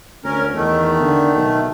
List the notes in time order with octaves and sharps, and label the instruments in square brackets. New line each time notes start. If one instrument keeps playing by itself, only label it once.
[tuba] D2 [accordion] C#4 A#4
[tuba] E2 [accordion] D#3 A3
[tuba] D3
B1